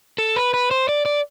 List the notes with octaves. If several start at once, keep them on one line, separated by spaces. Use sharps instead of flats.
A4
B4
B4
C5
D5
D5